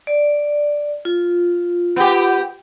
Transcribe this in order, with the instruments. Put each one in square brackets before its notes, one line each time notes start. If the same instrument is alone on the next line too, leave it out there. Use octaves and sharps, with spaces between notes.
[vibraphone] D5
F4
[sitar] B3 G4